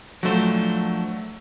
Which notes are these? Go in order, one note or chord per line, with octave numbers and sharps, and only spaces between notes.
F3 F#3 A3 D4 C5